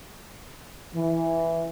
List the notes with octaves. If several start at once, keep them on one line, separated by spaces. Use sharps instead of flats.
E3